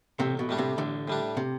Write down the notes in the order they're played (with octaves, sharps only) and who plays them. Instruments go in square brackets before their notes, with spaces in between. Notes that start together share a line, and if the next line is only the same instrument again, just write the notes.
[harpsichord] A1 [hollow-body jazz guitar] C3
[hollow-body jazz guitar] B2
[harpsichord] A2 G3 D4
[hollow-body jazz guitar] C3
[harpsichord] A1 [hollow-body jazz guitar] D3
[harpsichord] A2 G3 D4
[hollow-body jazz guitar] C3